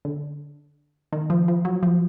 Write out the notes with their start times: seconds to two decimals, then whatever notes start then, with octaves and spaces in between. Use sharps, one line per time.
0.05 D3
1.12 D#3
1.30 F3
1.48 F3
1.65 F#3
1.83 F3